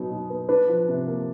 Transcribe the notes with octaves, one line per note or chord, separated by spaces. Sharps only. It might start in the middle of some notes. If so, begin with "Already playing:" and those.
Already playing: B2 F#3 B3 D#4
B2
B3
D4 B4
F3
C3
A#3